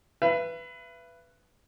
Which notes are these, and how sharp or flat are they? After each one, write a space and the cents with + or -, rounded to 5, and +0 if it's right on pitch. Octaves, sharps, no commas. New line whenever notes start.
B4 +0 E5 +40